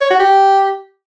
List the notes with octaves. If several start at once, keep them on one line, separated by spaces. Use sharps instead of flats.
C#5
F#4
G4